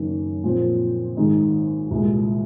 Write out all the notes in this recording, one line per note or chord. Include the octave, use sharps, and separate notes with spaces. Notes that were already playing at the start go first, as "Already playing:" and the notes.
Already playing: F#1 F#2 D#3
A#2 F3 C4
G#1 G#2 D#3 G#3 D#4
C2 A#2 G#3